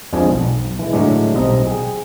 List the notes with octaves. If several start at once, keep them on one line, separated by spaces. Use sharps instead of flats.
F2 F3 G#3 D4 G#4 D5
B1
E3 G#3
A2 D3 F#3 G#3 A3 D4
B1 G3 C4 D#5 A#5
G#4 G5